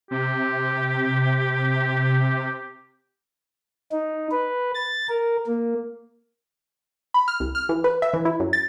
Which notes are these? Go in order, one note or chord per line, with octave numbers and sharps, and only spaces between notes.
C3 G4
D#4
B4
A6
A#4
A#3
B5
F6
C2
F6
E3
B4
E5
E3
E4
F#2
A6